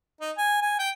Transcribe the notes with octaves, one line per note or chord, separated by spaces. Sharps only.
D#4
G#5
G#5
G5